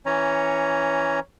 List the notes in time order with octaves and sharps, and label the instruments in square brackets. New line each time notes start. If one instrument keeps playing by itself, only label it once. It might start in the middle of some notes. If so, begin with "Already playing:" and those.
[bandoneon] E3 C#4 C#5 A#5